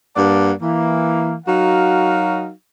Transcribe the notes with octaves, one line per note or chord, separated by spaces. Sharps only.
G2 A#3 D5 F#5 A5
E3 A#3
F#3 D#4 F#4 A#4 F5